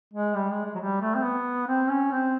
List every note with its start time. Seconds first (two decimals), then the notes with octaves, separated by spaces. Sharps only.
0.13 G#3
0.36 G3
0.50 G#3
0.65 G#3
0.75 F#3
0.79 G3
1.01 A3
1.15 C4
1.23 B3
1.67 C4
1.89 C#4
2.11 C4